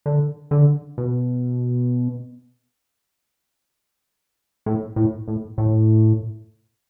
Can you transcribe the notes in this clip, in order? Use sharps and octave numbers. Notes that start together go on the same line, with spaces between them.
D3
D3
B2
A2
A2
A2
A2